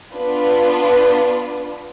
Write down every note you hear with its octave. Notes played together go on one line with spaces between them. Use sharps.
B3 D4 F4 B4